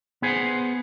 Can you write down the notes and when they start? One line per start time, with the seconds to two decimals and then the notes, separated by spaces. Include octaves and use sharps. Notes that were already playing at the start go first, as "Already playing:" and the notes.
0.22 B3 G#4 C5